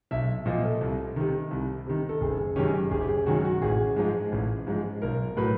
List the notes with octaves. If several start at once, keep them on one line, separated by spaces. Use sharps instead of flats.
B1 E5
A#2 F3 D#5
A4
C2
C3 D#3
C2
C3 D#3
A4
F#1 G#4
F#2 D#3 G#3 C#4 G4
F#1 G#4
G4
G#4
F#2 D#3 G#3 C#4 F#4
F#4
A1 G#4
G#2 F3 G#3
A1
G#2 F3 G#3
B1 A#4
A2 F#3 B4